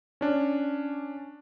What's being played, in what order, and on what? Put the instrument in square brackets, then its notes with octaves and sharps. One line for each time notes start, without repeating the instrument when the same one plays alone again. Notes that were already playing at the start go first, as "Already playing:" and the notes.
[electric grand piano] C#4 D4